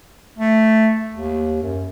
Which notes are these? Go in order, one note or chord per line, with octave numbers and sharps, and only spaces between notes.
A3
D#2
F#2